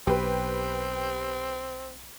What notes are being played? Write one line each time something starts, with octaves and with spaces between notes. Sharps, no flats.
B1 C4 G4 B4